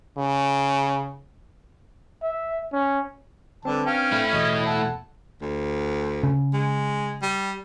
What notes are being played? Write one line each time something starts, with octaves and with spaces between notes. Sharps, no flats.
C#3
E5
C#4
D3 G3 C4 D4 B4 A5
C#4 F5 G5
A3 E4
E2 B2 D#5 G#6
A4 F#5
D2
C#3
G#3
G3